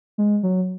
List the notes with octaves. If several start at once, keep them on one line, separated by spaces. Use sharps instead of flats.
G#3
F#3